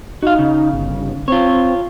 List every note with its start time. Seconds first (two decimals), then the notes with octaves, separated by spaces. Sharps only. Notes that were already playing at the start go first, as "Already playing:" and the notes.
0.23 D#4 F#4 F5
0.39 C#3
0.73 G1
1.28 C4 F4 C#5